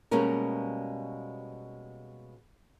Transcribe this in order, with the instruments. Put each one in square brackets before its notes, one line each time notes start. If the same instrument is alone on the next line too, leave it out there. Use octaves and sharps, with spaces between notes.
[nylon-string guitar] B2 G3 G#3 A#3 C#4 A#4